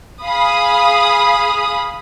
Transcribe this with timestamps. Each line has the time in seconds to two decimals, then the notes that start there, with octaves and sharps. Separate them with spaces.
0.23 G#4 F5 B5 D#6